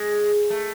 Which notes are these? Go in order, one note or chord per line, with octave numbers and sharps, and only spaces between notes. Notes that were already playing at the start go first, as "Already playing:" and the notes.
Already playing: G#3
A3